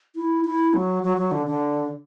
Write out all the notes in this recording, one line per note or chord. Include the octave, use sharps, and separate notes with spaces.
E4
E4
F#3
F#3
F#3
D3
D3